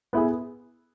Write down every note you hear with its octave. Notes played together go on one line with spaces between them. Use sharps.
B3 E4 G#4